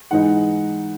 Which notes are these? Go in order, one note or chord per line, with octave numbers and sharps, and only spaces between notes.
G#2 E3 G#3 D#4 F#5